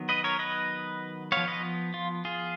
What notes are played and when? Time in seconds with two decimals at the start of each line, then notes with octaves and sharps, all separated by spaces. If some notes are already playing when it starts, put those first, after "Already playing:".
Already playing: D#3 F#3 B3
0.09 B4 D#5
0.24 A#4 C#5
0.39 B4 D#5
1.32 F3 B3 C#5 F5
1.48 B4 D#5
1.94 F4
2.25 F4 G#4